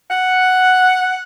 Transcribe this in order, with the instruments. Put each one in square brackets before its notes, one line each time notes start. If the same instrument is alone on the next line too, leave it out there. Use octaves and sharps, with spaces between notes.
[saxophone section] F#5